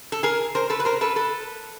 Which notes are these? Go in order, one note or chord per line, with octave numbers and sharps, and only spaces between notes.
A4
G#4 A#4
A#4 C5
A4 B4
B4
A#4 C5
A4 B4
A4 B4